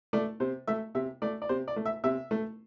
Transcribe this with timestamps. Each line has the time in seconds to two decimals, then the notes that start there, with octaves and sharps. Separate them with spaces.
0.13 A3 D5
0.40 C3 C5
0.67 A3 E5
0.95 C3 E5
1.22 A3 D5
1.42 D5
1.49 C3 C5
1.68 D5
1.76 A3
1.86 E5
2.04 C3 E5
2.31 A3